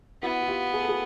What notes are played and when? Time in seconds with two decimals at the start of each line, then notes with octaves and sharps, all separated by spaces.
0.22 B3 E4 F#4
0.41 F#4
0.48 F4 G4
0.74 G#4
0.82 A4
0.89 F#4 G#4